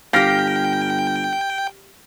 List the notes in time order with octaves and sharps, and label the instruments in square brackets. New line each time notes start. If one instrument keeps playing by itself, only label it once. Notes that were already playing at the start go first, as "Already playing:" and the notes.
[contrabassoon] G1 [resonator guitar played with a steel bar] G4 F5 [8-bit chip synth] G5 [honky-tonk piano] F6 A#6 B6